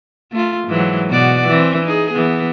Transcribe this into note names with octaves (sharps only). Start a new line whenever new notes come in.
A3 F4
G#2 E3 F#3
B2 F#4 D5
E3 C4
D#4 G#4
E3 B3